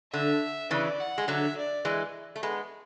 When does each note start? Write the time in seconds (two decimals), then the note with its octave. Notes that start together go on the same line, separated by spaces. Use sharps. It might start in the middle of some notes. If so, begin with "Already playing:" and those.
0.13 D3 E5
0.71 C#3 E3 D5
1.00 F#5
1.18 G#3
1.28 D3 F#3 E5
1.57 D5
1.85 E3 G#3
2.36 A3
2.43 G#3 B3